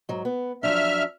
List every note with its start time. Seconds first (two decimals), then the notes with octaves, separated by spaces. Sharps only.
0.09 G#2 F#3
0.25 B3
0.63 F3 F#3 D4 E5 F6